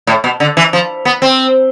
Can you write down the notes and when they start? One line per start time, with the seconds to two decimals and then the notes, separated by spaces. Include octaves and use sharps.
0.07 A2
0.24 B2
0.40 D3
0.57 E3
0.73 F3
1.05 B3
1.22 C4